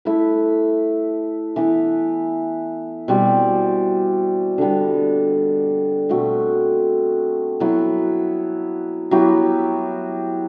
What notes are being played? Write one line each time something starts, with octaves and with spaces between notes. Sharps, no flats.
A3 E4 B4
E3 B3 E4 B4
B2 G3 C4
D3 G3 B3
B2 A3 C4 F#4
F#3 B3 E4
F#3 B3 E4 G4